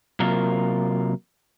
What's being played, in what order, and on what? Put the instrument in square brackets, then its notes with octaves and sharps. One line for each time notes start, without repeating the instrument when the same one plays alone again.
[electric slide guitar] C3 F#3 A#3 F4 A#4